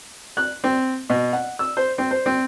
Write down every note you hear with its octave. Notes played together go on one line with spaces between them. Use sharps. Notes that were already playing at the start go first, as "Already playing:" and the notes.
F#6
C4
B2
F#5
E6
C5
C4
C5
C4